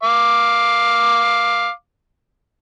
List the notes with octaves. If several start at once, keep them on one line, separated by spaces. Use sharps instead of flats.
F5 D6